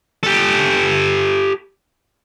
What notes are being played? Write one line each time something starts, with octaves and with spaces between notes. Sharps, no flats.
G4 A4